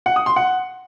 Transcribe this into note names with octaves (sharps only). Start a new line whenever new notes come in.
F#5
D#6
C6
F#5